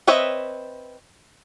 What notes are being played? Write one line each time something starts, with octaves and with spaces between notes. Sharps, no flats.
C4 B4 C#5 D#5 E5